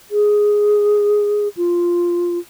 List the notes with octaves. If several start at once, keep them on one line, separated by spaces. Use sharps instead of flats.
G#4
F4